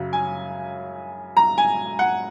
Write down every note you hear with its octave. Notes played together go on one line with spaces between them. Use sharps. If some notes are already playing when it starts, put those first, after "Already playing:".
Already playing: F#2 C#3 F#3
G#5
A#5
G#5
F#5